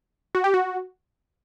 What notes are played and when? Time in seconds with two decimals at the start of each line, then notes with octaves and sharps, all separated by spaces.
0.35 F#4
0.44 G4
0.54 F#4